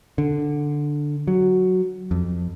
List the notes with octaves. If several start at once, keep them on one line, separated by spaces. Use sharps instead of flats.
D3
F#3
F2